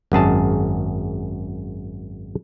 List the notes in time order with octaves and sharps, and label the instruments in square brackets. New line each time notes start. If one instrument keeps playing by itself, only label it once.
[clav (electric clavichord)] G#1 F#2 G#4 A5